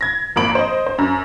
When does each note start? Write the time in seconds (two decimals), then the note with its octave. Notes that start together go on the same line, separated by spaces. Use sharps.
0.01 G#6 A#6
0.36 G#1 F3 A#3 B5 D7 F#7
0.55 C5 D#5
0.86 C5
0.98 F#2